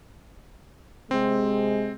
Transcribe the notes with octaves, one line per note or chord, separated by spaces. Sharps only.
C3 G#3 C4